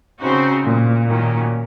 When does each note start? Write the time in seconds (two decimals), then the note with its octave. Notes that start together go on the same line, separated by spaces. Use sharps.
0.20 C#3 C4 D#4 F#4 C5
0.64 A#2
1.08 A#2 D#3 F#3 C#4